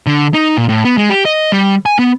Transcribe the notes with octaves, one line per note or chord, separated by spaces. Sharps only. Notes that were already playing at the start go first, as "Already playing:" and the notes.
D3
D#4
A#2
A2
B3
G#3
G4
D#5
G3
G#5
B3